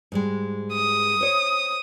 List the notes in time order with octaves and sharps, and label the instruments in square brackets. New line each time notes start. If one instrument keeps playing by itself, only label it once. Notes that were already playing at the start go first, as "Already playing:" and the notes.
[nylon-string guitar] G#2 G3 G#3
[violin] D#6
[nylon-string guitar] C5 C#5